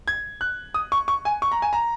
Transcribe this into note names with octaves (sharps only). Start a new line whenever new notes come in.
G#6
F#6
D#6
C#6
C#6
G#5
C#6
A#5
G#5
A#5